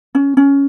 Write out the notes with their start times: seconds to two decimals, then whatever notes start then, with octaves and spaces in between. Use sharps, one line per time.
0.15 C#4
0.37 C#4